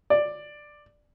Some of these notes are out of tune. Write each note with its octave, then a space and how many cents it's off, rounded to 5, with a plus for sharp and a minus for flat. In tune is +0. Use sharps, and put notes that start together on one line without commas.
D5 +10